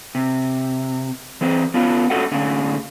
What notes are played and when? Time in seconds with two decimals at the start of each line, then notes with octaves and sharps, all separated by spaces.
0.15 C3
1.41 E3 C4 C5
1.74 B3 C#4 F4
2.10 C#4 F#4 A4 D#5 F#5
2.31 A2 D3 C#4